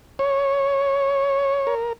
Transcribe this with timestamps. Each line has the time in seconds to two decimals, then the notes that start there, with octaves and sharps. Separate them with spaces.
0.19 C#5
1.67 A#4